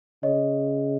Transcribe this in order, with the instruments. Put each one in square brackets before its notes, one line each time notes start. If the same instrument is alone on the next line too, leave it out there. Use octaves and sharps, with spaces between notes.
[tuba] C#3 [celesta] C#5 D#5